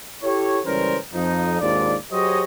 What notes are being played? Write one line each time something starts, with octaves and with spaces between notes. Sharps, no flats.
E4 G4 A4 C#5
C#2 E3 G3 C#4 A#4 C5
F2 F3 D#4
D#2 G#2 D4 F4 D5
F#3 G4 G#4 C5 C#5 D#5